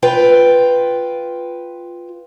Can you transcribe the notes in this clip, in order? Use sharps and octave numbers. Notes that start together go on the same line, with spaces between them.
F4 B4 G5